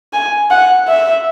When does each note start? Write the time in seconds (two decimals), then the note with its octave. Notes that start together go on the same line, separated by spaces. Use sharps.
0.13 G#5
0.50 F#5
0.88 E5